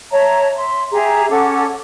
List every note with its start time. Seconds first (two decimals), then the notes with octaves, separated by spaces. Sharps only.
0.11 C#5 E5 A5 A#5
0.56 E5 C6
0.92 G4 G#4 E5 A#5
1.30 C#4 A4 F#5 D6